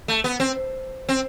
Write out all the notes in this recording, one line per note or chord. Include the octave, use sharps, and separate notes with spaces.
A3
B3
C4
C4